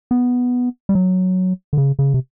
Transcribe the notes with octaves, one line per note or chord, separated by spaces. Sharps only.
B3
G3
F#3
D3
C#3
C#3
C3